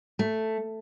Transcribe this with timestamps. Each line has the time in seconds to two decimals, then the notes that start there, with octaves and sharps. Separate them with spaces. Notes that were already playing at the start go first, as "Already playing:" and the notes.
0.19 A3